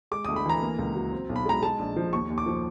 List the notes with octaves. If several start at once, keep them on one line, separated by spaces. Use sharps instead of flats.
G#3 D6
D2 D#6
B5
E3 A#5
A#3
C#2
F#3
C4
B1
B5
G#3 A#5
G#3 A5
A#1
F3
D#2 C#6
D#2
D6
F3